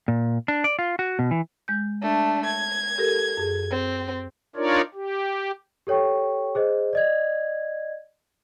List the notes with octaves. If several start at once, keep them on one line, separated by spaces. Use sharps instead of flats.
A#2
D4
D5
F4
F#4
B2
E3
G#3 G6
A3 D4
G#6
G4 A4 A#4
F#2 G#4
C4
D4 D#4 F4 A#4 C#5 D5
G4
G4 A4 C#5 G5 C#6
G#4 C5 D#5
D5 D#5 G#6